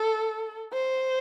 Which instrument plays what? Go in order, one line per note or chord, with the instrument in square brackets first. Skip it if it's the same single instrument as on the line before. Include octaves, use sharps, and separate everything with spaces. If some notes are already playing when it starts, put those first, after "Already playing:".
Already playing: [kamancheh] A4
C5